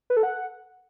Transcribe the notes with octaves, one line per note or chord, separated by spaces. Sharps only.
B4
A4
F#5